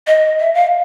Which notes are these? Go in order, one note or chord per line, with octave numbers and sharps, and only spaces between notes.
D#5
E5
F5